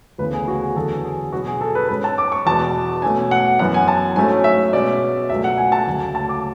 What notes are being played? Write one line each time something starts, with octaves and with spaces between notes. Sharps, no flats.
D2 C#3 E3 B3 B4
G#4
F#4
G#4
E2 D3 F#3 B3 A4
G#4
B2 F#3 B3 F#4
G#4
A4
B4
G#2 G#3 C#4 B4
A5
D6
C#6
E2 B2 G#3 B3 A5
B2 A3 C#4 G#5
F#5
F#2 E3 B3 F#5
G#5
A5
G#2 F#3 A3 C#4 G#5
E5
B2 G#3 C#4 D5
C#2 B2 F#3 A3 E5
F#5
G#5
A5
D2 C#3 F#3
A5
D6